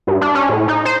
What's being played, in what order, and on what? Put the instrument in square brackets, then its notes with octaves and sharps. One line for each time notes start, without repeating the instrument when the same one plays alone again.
[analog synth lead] G2
D4
C#4
A2
D#4
C5